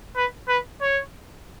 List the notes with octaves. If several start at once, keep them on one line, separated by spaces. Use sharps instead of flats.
B4
B4
C#5